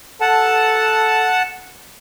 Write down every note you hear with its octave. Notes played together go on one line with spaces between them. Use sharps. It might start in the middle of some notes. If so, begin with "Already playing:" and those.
A4 F#5 A5